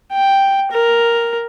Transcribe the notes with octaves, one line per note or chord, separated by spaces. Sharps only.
G5
A#4